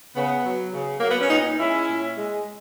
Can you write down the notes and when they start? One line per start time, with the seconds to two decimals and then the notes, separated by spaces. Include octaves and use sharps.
0.15 C#3 B3
0.44 F#3
0.73 C#3
1.00 F#3 A#3
1.10 B3
1.20 C#4
1.30 A#2 B3 D#4
1.59 G#3 C#4 E4
1.88 A#2
2.17 G#3